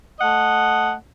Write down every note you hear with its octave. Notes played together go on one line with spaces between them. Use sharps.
A3 D#5 F#5